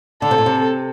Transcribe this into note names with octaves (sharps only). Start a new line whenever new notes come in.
D3 A4
C3
A#2
C3